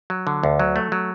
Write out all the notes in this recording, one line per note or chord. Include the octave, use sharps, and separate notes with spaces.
F#3
D3
D2
F#3
A3
F#3